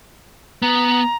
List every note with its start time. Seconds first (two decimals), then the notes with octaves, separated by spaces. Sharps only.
0.62 B3 A#5